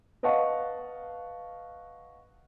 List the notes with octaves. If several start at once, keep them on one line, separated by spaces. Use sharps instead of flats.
B4 D#5 F5 F#5 A5 C#6